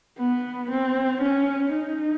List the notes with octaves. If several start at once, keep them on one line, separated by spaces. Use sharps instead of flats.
B3
C4
C#4
D#4